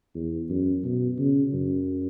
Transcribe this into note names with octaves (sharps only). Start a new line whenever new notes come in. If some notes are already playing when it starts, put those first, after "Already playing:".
E2
F#2
B2
C#3
F#2